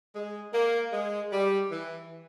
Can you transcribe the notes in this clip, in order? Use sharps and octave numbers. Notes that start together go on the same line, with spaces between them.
G#3
A#3
G#3
G3
E3